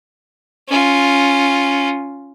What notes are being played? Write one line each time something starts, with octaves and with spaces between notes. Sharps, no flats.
C#4 F4